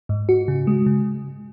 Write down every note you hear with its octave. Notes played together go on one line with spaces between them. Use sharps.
G#2
F#4
C#3
G#3
C#3